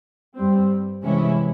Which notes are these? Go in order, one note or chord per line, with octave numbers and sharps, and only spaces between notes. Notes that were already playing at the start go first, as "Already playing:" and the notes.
G2 G3 C4
C3 E3 G#3 C#4 E4